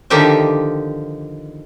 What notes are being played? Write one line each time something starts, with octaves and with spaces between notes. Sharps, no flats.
D3 D#3 F3 G4 E5